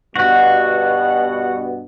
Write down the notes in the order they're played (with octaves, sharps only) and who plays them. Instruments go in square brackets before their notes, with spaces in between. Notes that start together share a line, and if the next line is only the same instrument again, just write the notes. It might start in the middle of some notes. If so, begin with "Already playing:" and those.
[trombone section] G2 B2 [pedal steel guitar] F#4 F#5